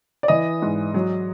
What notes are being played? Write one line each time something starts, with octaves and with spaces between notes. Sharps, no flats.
D5
E3 D#5
G#2
F#3